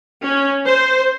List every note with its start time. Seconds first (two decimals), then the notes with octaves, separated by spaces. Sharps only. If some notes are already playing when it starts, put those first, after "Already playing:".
0.23 C#4
0.64 C5